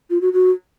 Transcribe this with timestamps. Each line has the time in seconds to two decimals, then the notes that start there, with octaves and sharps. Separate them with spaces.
0.10 F4
0.22 F#4
0.33 F#4